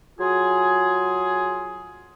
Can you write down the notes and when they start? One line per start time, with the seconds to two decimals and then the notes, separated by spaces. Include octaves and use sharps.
0.19 F#3 F4 G#4